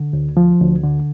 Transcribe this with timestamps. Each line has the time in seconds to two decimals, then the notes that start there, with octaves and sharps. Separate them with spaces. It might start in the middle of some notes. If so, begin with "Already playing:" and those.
Already playing: D3
0.13 D2
0.37 F3
0.60 D2
0.84 D3